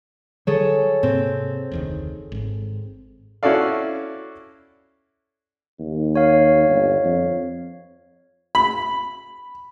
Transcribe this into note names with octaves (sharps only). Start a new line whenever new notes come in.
D3 F#3 G3 G#4 A4 C#5
G#2 C3 A#3 C4
F1 D2 D#3
G#1 G#2
C#4 E4 F#4 A4 D5 F5
D#2
C#5 F5
G1
F2
B5